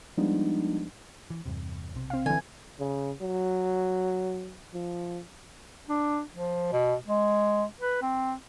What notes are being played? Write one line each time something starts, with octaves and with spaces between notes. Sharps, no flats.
F3 G3 G#3 B3 D4 D#4
E3
E2 G2 C3
B1 C3
C4 F5
D3 E3 G#5
C#3
F#3
F3
D4
F3
B2
G#3
B4
C4